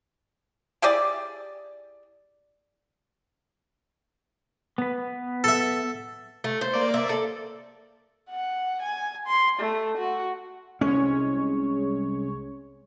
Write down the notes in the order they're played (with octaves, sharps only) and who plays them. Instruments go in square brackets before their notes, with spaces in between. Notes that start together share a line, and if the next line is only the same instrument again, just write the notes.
[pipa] E4 G4 G#4 D5
[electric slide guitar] B3 B4
[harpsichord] A4 E5
[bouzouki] A3
C5
[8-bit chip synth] A#3 D5
[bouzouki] E5
A4
[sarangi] F#5
G#5
C6
A3
F#4
[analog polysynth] C2 G#3 C#5 [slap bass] C#4